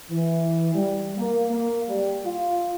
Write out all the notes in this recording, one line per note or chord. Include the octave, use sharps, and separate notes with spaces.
E3
G3
A#3
A#3
G3
F4